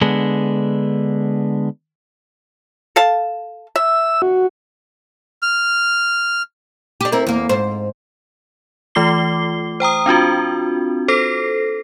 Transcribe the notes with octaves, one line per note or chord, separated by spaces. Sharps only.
D3 G#3 B3 D4
A4 F5 A5
E5 E6
F#4
F6
D4 G4
C4 E4 A#4
E2 A#3
G#2 C5
E3 A3 F4 D6 C7 G7
C5 G5 A#5 D#6
C4 D4 F4 F#4
A4 C5 A#6 C7